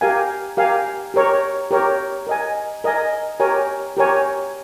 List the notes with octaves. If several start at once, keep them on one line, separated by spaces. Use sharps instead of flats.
G4 A#4 F5 G#5
G4 A#4 F5 G#5
G4 A#4 C#5
G4 A#4 C#5
A#4 D#5 G#5
A#4 D#5 G#5
G4 A#4 C#5 G#5
G4 A#4 C#5 G#5